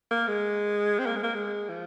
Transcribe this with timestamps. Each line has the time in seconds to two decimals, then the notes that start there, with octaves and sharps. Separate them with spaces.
0.11 A#3
0.28 G#3
0.99 C4
1.07 A#3
1.16 G#3
1.24 A#3
1.34 G#3
1.69 F3